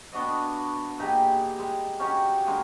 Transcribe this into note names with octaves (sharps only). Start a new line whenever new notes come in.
B3 D4 F#4 D#5
A#2 D#4 G4 G#4
G3 G#3
C#4 D#4 F#4 G4
D3 G#3 A#3